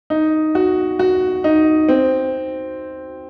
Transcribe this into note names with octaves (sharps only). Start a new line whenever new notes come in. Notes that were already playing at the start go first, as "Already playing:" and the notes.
D#4
F#4
F#4
D#4
C4